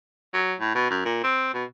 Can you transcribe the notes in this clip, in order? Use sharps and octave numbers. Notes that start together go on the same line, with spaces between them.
F#3
A2
B2
F#2
A#2
C4
B2